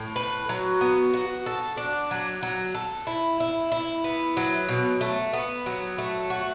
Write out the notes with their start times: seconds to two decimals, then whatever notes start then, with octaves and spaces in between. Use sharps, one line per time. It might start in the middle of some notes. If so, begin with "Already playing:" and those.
Already playing: A2
0.16 B4
0.49 F#3
0.81 B3
1.14 F#4
1.46 A4
1.77 D4
2.11 F#3
2.43 F#3
2.74 A4
3.07 E4
3.40 E4
3.72 E4
4.04 B3
4.37 F#3
4.68 B2
5.01 A3
5.33 B3
5.66 F#3
5.98 A3
6.30 F#4